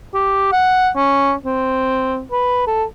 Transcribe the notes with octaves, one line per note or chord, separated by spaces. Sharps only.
G4
F#5
C#4
C4
B4
A4